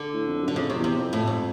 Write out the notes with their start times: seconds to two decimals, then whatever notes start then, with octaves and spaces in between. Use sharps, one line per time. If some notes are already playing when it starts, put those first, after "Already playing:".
Already playing: D3
0.13 A2
0.27 F2
0.42 F#2
0.48 D3
0.56 F2 C#3
0.70 C3
0.77 E2
0.84 C3
0.99 F2
1.13 A2
1.27 G#2